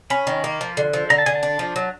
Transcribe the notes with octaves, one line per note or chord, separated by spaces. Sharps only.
C#4 B5
D#3
A#3
F3
D3
F3
D3 A#5
A5
D3 G#5
A5
D4
F3
F#3